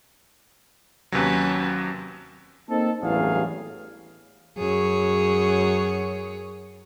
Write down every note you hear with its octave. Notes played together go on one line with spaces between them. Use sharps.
D#2 C3 F#3 C#4 B4
A#3 C4 D#4 A4
A1 E2 G2 F#3 G#4 F5
F#2 G#4 C#5